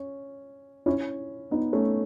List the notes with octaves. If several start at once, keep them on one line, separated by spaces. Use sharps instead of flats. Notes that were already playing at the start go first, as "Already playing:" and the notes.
Already playing: C#4
C#4 E4
B3 D#4
A3 C#4